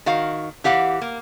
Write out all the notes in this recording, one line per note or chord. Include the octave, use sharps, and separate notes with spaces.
D#3 F#4 F5
E3 G4 F5 F#5
A#3